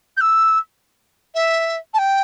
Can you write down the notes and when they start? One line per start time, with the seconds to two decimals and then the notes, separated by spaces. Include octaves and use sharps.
0.17 G6
0.21 E6
1.35 E5
1.94 A5
1.98 G5